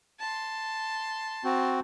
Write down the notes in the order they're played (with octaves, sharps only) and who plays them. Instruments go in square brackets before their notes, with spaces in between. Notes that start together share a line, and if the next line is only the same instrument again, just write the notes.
[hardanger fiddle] A5 C6
[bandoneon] C4 F#4